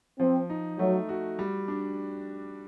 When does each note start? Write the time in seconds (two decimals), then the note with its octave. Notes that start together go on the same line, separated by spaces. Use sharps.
0.20 F3 C4
0.50 D#4
0.79 F#3 A3
1.09 F#4
1.39 G3
1.68 D4